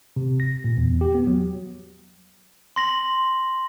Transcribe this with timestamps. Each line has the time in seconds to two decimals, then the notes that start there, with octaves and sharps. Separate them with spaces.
0.16 C3
0.40 A#6
0.64 A#2
0.78 E2
1.01 G4
1.15 B3
1.27 F#3
2.76 C6 A#6 F#7